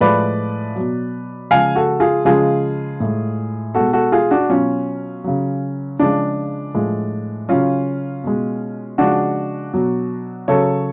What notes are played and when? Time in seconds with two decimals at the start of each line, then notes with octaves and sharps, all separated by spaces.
0.01 A2 F3 G#3 B4 D5
0.76 B2 F#3
1.51 C#3 F3 G#3 F5 G#5
1.76 F#4 A4
2.00 F4 G#4
2.25 C#3 F3 G#3 F4 G#4
3.00 A2 G#3
3.75 B2 G#3 F#4 A4
3.93 F#4 A4
4.12 F4 G#4
4.31 D4 F#4
4.49 B2 F#3 C#4 F4
5.24 C#3 F#3
5.99 C#3 F3 G#3 D4
6.75 A2 F3 G#3
7.49 C#3 F#3 C#4 F4
8.24 B2 G#3
8.98 C#3 F3 G#3 D4 F#4
9.74 B2 F#3
10.48 C#3 F#3 A4 C#5